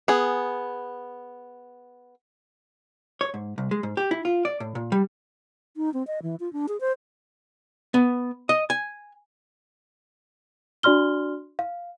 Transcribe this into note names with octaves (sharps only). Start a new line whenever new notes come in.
B3 G#4
C#5
G#2
C2
G#3
G#2
G4
E4
F4
D5
A2
A#2
G3
D#4
C4
D#5
E3
F4
D4
G#4
C5
B3
D#5
G#5
D4 F#4 D5 C6 F6 G7
F5